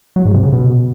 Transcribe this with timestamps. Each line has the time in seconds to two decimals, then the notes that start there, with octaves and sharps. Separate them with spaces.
0.16 F#3
0.25 G#2
0.34 C3
0.43 C#3
0.53 B2